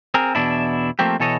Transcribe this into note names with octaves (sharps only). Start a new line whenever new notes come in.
C4 G#4 A#4
E2 B2 D4 E4
F3 A3 A#3 C4 G4
B2 E3 A4 C#5 D#5